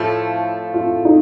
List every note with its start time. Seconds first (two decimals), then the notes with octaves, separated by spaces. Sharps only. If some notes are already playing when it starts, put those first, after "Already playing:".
Already playing: A2 F3 A3 F4
0.74 F4
1.05 D#4